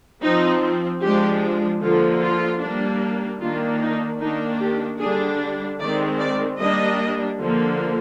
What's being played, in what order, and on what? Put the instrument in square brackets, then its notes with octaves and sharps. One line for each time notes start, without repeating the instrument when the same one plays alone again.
[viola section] F3 C4 D#4
F3 G#3 D4 G4
D3 F3 A#3 F4
F4
G3 A#3 D4
D#3 A#3 D4 F4
D#4
D#3 A#3 D4 D#4
G4
D3 G3 D4 G#4
D#3 G#3 C4 D5
D5
G3 A#3 D4 D#5
D3 F3 A#3